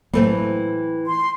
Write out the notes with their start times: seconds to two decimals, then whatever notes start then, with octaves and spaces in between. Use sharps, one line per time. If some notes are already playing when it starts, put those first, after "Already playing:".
0.13 A2 E3 F#3 A3 A#3 C4
1.07 C6